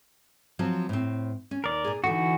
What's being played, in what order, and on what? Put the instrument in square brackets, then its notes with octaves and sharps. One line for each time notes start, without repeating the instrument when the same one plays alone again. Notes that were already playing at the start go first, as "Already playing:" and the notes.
[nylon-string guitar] F3 F#3 C4
A2 C4
C#4
[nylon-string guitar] D#2 [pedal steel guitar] A#4 D5
[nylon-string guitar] A#2 G#4
[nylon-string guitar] D3 D#4 [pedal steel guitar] E3 F#4